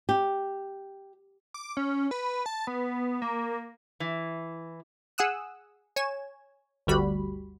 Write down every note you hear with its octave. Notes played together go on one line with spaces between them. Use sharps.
G4
D6
C#4
B4
A5
B3
A#3
E3
G#4 F#5 D#6 E6 F#6
C#5 G#5 E7
G1 D2 G3 F#4 B5